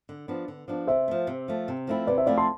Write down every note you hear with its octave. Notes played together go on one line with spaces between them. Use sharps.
D3
F3 B3 D4
D3
F3 B3 D4
C3 C5 E5
F3 A3
C3
F3 A3
C3
F3 A3 C4 E4
C3 B4 D5
C5 E5
F3 A3 C4 E4 D5 F5
A5 C6